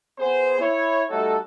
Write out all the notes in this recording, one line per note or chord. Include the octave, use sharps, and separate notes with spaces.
B3 G#4 C5
E4 C#5
G3 A3 D#4 F#4 A4